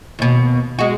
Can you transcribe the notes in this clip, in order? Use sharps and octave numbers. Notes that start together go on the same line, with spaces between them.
D#2 B2
G#3 F#4